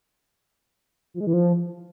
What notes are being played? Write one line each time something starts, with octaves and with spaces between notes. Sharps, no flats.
F3
G#3
E3
F3